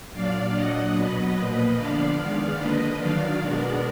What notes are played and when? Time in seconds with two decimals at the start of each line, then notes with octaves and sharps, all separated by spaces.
0.13 A#2 F#3 D4 D5 F5
0.53 A#2 F#3 D4 D#5 F#5
0.94 B2 F#3 B3 B4 D#5
1.35 A#2 F3 A#3
1.77 D3 F3 B3 D4 D5 F5
2.17 D#3 G#3 B3
2.57 D3 F3 A#3 D4 B4 D#5
2.99 D#3 F#3 D4 D5 F5
3.39 B2 G#3 B3 D4 A#4 D5